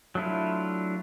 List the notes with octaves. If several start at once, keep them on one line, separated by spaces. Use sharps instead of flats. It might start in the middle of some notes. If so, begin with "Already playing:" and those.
F#3 A3 D4 E4 F4